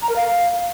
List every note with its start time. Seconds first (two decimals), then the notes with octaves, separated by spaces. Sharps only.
0.02 A#5
0.09 A#4
0.16 F5